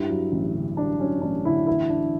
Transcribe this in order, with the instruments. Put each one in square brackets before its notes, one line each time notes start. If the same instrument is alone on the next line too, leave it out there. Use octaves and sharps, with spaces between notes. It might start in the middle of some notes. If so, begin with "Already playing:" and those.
Already playing: [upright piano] G2 [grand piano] E4
[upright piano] F#3
A1
D3
[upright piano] G2 [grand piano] D4
[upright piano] F#3 [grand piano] C#4
[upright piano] A1 [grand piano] D4
[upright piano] D3 [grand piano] E4
[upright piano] E3 [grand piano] E4
[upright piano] D4